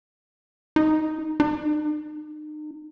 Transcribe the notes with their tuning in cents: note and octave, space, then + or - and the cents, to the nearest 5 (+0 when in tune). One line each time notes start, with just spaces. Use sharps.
D#4 +5
D#4 -40